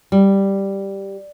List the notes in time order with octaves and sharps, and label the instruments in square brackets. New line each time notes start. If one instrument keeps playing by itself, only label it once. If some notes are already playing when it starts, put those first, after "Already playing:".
[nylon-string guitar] G3